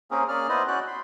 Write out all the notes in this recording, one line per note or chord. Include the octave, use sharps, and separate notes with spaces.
A#3 C4 C#4 G#4 A#4
A#3 C#4 G#4 D5 F6
B3 E4 B4 C5 D5 D#5
C#4 F#4 D5 G5 F#6
B5 C6